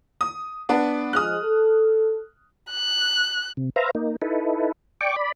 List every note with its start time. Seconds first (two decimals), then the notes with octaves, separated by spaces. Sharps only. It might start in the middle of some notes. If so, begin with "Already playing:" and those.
0.21 D#6
0.69 B3 D4
1.13 F3 G#3 D#6 F6 F#6
1.44 A4
2.71 F#6
3.57 C3
3.76 B4 C5 E5 F5 A#5
3.95 A#3 D#4
4.22 D#4 E4 A4 B4
5.01 D5 G5 C#6 D6
5.16 D5 B5